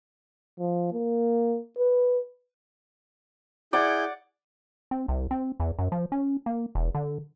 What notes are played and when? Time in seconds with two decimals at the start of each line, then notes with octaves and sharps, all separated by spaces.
0.59 F3
0.93 A#3
1.78 B4
3.73 E4 G#4 D5 F#5 G6
4.91 C4
5.08 C2
5.31 C4
5.60 E2
5.79 F#2
5.92 F3
6.12 C#4
6.46 A#3
6.75 E1
6.95 D3